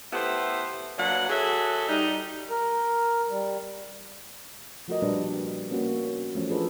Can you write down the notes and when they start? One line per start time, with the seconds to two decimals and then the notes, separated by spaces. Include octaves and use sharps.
0.13 A3 B3 E4 G4 C5
0.98 F#3 A#3 D4 B4 F#5
1.29 F#4 G#4 A4 C#5 E5
1.89 G3 D#4
2.50 A#4
3.30 G3
4.88 F3 A3 F#4 A4 A#4 D#5
5.02 A#2 G3 D4 B4
5.27 D4
5.71 A#3 B3 C#4 F#4
6.34 E3 F3 A3 C#4
6.49 C#4 D4 F4 G#4 A4 B4